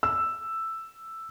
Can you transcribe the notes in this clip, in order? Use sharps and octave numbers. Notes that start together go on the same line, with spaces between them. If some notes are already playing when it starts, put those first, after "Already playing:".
E6